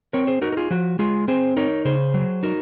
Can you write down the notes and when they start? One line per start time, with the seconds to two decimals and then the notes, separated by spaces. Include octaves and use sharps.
0.13 C4 A#4 C#5
0.27 G#4 C5
0.42 D#4 F#4 A#4
0.52 A#4
0.57 F4 G#4
0.71 F3 F#4
0.99 G#3 F4 G#4
1.28 C4 G#4 C5
1.57 D#4 A#4 C#5
1.85 C#3 G#4 C5
2.14 F#3
2.43 D#4 F#4 A#4